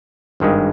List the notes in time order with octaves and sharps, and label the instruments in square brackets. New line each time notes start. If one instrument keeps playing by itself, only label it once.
[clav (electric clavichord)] G#1 G2 D#3 G#3